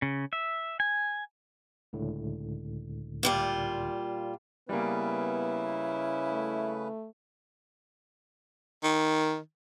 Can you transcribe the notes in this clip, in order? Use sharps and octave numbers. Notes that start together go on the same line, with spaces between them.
C#3
E5
G#5
C#2 A2 D3
A#2 G3 F4
C#3 G3 A#3 B3 C#4 E4 B4
A3
D#3